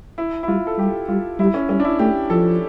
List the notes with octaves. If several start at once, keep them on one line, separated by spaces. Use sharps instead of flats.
E4
E4
G3 F4
A4
G3 G4
G3 F4
G3 E4
C#4
G3 C#4
D4
E4
A3 G4
F3 A4